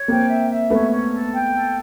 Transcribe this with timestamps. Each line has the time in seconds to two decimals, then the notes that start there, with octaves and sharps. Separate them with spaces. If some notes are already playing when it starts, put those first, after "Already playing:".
Already playing: C#5
0.08 A#3 C4 G5
0.28 E5
0.50 E5
0.70 A3 B3 C#4
0.91 C#4
1.12 A4
1.33 G5
1.53 A4